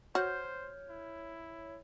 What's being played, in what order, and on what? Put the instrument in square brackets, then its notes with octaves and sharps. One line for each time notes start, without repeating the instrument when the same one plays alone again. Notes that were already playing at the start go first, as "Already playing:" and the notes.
[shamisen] F#4 [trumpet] C5 [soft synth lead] C#5 [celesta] F6 G6
[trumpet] E4